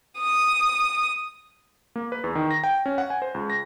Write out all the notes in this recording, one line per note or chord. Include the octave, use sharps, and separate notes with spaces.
D#6
A#3
B4
E2
D#3
A#6
G5
C#4
F#5
G#5
C5
C#2
A#6